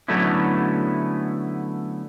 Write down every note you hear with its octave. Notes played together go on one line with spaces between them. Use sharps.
D3 F#3 A3 B3 C#4 E4